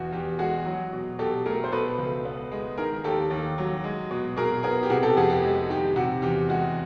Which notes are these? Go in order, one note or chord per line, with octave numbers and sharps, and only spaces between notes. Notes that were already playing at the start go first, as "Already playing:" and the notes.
Already playing: E2 B2 F#4
E2 G4
G#3 F#4 G#4
F#3
B2
B2 G4 A4
A3 G#4 A#4
C5
B2 A4 B4
C#2
B3
G#3
D#3 G#4 A#4
D#2 G4 A4
D#2
F#3
G#3
B2
B2 G#4 A#4
B3 G#4 A#4
G4
C3 F#4 G#4
G4 A4
F2 F#4 G#4
G4
G#3
D#3 G4
C3 F#4
E2 G4
G#3 F#4